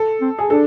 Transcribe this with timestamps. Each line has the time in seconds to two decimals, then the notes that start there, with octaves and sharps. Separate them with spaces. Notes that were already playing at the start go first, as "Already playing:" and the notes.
Already playing: A4
0.21 C4
0.39 G#4
0.50 D4 A4